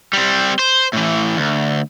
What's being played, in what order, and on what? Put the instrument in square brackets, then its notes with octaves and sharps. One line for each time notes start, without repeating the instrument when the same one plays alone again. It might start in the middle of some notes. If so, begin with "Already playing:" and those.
[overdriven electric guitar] G3 C4
C5
A2 E3
D2